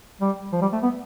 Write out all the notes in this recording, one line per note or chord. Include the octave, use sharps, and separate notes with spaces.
G3
F3
G3
A3
B3